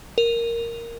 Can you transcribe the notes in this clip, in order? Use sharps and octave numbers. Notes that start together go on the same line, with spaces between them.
A#4